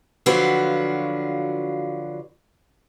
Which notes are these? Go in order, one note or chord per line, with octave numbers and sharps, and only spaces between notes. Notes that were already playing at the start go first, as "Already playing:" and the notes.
D3 F3 F#3 F4 F#4 B4